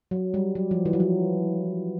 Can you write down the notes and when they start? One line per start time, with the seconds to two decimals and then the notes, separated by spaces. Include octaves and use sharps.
0.11 F#3
0.34 G3
0.55 F#3
0.71 F3
0.86 E3
0.93 F#3
1.00 F3